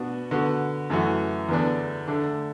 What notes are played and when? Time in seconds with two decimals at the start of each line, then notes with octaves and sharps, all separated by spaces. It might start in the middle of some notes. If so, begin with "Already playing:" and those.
Already playing: B2 B3 D4 F#4
0.31 D3 B3 F#4
0.90 F#2 E3 A3 F#4
1.49 E2 D3 B3 D4
2.08 D3 A3 D4